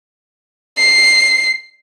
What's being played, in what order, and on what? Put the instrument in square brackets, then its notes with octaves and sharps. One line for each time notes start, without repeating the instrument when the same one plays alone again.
[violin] C7